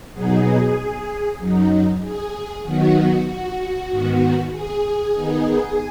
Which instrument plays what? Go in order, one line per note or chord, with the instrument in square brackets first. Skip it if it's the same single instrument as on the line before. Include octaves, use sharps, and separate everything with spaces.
[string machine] B2 F#3 B3 D#4 G#4
F#2 F#3 D#4
G#4
D#3 F#3 B3 D#4 F#4
F#4
G#2 D#3 B3
G#4
D#3 B3 D#4